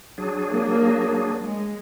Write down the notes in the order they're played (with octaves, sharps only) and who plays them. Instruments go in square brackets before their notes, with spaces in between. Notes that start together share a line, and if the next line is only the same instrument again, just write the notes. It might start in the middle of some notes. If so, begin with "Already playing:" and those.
[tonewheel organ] F#3 D4 G#4
[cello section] A#3
G#3